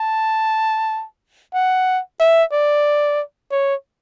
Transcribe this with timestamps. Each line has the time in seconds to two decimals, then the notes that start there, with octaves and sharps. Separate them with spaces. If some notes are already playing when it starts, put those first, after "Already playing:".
Already playing: A5
1.54 F#5
2.20 E5
2.52 D5
3.52 C#5